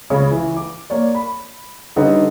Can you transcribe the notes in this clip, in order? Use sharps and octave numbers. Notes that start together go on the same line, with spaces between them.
C#2 C#3 C#4 B5
E3
D6
A#3 C#5 D5
B5
D3 G3 C#4 D#4 B4